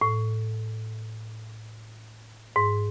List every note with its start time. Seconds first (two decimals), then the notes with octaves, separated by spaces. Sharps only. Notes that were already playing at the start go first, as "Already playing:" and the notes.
0.01 A2
2.56 G#2